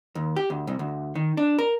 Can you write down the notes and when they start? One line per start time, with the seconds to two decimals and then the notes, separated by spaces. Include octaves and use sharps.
0.15 D#2
0.36 G4
0.50 D2
0.67 C2
0.79 D2
1.15 D#3
1.37 D4
1.59 A#4